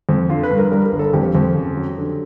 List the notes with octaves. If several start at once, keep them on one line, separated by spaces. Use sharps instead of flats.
F2
D3 F4
B4
G2
A#4
G3 A#4
A#4
G1
A4
F2 G4
F2
C#3
F#3
D3